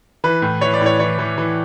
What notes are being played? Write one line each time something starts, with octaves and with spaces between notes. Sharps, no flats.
E3 B4
A2
E3 C#5
D5
A2
C#5
E3 C#5
E3
E3